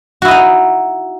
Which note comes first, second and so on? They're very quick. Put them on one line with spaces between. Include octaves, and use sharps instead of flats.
F#4 E4 D#5 D#4